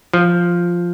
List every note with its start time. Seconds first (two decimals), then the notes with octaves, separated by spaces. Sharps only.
0.14 F3